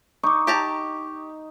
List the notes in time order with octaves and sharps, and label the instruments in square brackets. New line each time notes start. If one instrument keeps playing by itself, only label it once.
[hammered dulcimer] D#4 [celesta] C#6 D6
[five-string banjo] G4 A5 A#5